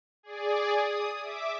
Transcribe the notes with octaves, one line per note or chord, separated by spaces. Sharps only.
G#4 D5
D#6
E5 D6